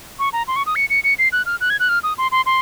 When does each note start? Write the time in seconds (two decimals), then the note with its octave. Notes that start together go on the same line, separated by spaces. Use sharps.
0.19 C#6
0.33 A#5
0.48 C6
0.56 C#6
0.66 D#6
0.76 C#7
0.90 C#7
1.04 C#7
1.19 C7
1.32 F#6
1.46 F6
1.61 F#6
1.70 G#6
1.80 F#6
1.89 F6
2.03 D#6
2.18 C6
2.32 C6
2.46 C6